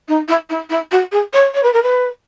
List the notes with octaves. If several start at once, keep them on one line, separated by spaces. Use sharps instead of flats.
D#4
E4
E4
E4
F#4
G#4
C#5
C#5
B4
A#4
B4